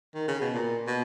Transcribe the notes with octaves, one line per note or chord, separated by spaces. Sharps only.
D#3
C#3
B2
A#2
B2